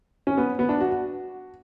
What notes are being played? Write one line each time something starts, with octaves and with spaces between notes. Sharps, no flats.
C#4
B3
B3
D4
F#4
F#4